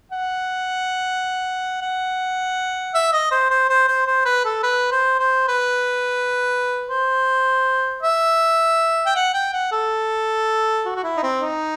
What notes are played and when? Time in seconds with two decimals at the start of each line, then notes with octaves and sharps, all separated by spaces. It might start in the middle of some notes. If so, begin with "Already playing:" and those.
0.12 F#5
1.81 F#5
2.94 E5
3.13 D#5
3.31 C5
3.51 C5
3.69 C5
3.88 C5
4.07 C5
4.25 B4
4.45 A4
4.63 B4
4.91 C5
5.19 C5
5.48 B4
6.89 C5
8.02 E5
9.06 G5
9.16 F#5
9.34 G5
9.53 F#5
9.72 A4
10.85 F#4
10.96 F#4
11.04 E4
11.17 D#4
11.23 C4
11.41 D#4